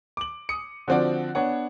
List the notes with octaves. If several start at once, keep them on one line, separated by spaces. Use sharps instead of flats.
D6 F#7
D#6 C#7
D3 F3 C4 F#4 D5
B3 D4 C#5 F#5